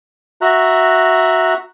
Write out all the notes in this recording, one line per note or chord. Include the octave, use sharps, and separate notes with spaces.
F#4 E5 A#5 F#6